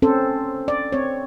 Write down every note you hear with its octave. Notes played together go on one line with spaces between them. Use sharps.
C4 C#4 A4 C5
D5
C4 C#5